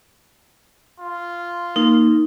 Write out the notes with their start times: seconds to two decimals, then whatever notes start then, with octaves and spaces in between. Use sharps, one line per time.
1.00 F4
1.76 A#3 D#4